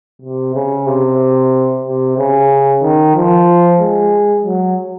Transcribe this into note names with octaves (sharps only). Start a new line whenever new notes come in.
C3
C#3
C3
C3
C#3
D#3
F3
G#3
F#3